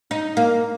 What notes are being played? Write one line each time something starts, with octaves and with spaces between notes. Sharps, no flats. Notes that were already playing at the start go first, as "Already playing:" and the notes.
D#4
A#3